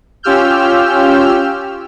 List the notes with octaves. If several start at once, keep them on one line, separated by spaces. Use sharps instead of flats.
C#4 F4 G4 E6 F6 G6